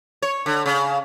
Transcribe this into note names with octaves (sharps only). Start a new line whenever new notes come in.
C#5
D3
C#3